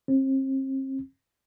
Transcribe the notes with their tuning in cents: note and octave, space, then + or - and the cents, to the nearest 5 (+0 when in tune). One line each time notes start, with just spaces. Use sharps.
C4 +35